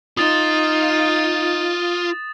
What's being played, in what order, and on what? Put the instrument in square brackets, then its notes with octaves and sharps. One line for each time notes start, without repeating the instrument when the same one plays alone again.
[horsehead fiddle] D#4 [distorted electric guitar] F4 [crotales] D#6 A6 E7